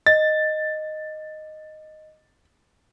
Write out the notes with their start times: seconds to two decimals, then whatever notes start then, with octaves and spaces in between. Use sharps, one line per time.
0.06 D#5 A6